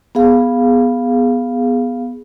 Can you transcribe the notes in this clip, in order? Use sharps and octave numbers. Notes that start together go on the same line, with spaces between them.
B3 G#4 F5